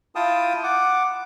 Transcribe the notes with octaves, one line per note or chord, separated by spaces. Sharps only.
E4 F4 F5 G5 A5 D#6
F#5 D6